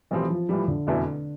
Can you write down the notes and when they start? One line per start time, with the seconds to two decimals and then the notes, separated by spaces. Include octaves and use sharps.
0.11 B1 A2 E3 F3 C4 G4
0.30 F3
0.49 A2 E3 F3 G3
0.68 D3
0.87 F1 E2 B2 A3 E4